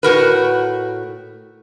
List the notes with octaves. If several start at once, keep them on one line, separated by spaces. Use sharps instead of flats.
A2 F#4 A#4 B4